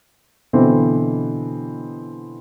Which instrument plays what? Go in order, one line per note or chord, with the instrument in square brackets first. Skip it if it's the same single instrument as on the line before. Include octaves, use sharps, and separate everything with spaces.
[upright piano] B2 D3 E3 B3 C4